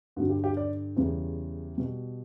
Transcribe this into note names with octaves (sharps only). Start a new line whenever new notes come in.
G2 D3 G3 F#4
G4
G4
D5
E2 C#3 G3
B2 G3